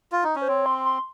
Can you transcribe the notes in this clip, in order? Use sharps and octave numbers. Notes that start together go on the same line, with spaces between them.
F4
D#4
C#4
C5
C4 C#5
C6
C6